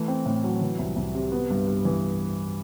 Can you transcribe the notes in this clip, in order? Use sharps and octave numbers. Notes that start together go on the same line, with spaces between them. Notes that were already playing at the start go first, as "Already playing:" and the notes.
Already playing: E3 A3
C4
A2
F#3
E3
C2
C2
C3
B3
G2
G2
E3